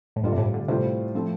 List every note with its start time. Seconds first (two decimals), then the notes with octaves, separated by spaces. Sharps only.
0.16 A2
0.23 G2 G3 F4 A4 D5
0.32 C3
0.38 A2
0.54 D3
0.68 A2 C3 G3 F4 A4 C5
1.15 F3 A3 C4